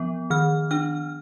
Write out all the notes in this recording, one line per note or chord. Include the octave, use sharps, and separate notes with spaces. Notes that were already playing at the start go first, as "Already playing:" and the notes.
Already playing: F3 B3
D#3 F6
D4 F6